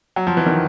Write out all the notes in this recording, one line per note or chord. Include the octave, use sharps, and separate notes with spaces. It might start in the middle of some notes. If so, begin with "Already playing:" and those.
F#3
F3
E3
D#3